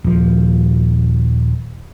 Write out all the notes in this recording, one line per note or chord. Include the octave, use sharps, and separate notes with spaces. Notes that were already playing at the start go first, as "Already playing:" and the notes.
D#1 F3